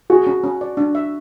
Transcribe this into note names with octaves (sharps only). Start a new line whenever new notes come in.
F#4 G#4
C#4
C#4
D5
D4
E5